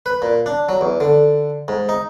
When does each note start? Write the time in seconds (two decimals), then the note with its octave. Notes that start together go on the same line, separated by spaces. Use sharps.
0.06 B4
0.22 A#2
0.46 D4
0.69 F#3
0.81 E2
1.00 D3
1.68 G#2
1.89 D#4